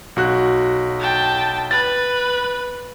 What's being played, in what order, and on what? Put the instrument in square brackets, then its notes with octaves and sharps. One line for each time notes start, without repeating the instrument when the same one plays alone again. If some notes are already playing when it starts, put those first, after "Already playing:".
[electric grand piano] B1 F#4 F#6
[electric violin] G5 A5
[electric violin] B4 [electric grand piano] A6